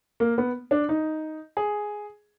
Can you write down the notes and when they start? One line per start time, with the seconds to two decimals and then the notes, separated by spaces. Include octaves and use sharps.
0.20 A#3
0.38 B3
0.71 D4
0.89 D#4
1.57 G#4